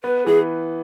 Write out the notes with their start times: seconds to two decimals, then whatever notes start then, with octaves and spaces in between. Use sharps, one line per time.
0.04 B3 B4
0.26 E3 G#4